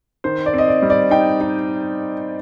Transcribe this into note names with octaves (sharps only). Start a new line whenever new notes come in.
D#3 C5
D5
C4 D#5
D5
G3
D5
D#4 G5
D#4